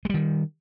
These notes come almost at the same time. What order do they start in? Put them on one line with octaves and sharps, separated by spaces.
G#3 G3 D#3